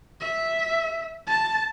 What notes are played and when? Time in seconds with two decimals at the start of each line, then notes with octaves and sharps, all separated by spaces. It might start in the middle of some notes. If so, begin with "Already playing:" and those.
0.21 E5
1.27 A5